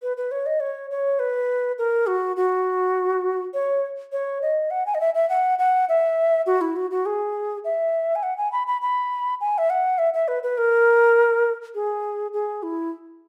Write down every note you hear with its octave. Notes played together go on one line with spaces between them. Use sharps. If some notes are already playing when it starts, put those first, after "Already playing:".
B4
B4
C#5
D#5
C#5
C#5
B4
A#4
F#4
F#4
C#5
C#5
D#5
F#5
G#5
D#5
E5
E5
F#5
F#5
E5
F#4
E4
F#4
F#4
G#4
E5
G#5
F#5
G#5
B5
B5
B5
G#5
E5
F#5
E5
E5
B4
B4
A#4
G#4
G#4
E4